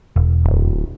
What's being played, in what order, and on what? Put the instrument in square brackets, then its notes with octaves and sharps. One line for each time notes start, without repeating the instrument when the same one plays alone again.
[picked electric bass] E1
[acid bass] D1